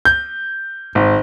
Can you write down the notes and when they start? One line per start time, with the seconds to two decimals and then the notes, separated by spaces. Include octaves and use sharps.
0.05 G6
0.95 G#1